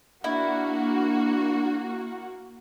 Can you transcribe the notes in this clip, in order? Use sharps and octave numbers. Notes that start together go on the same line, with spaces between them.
A#3 D4 E4 F#4